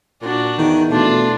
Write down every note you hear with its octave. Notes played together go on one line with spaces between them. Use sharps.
A#2 D4 F#4
E2 D#3
B2 A3 D4 F4